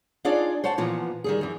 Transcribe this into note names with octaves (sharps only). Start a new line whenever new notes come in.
D4 D#4 F4 G#4 C#5 D5
C5 C#5 F#5 A5
A#2 E3 F3 B3
D#3 G3 G#4
F#2 E3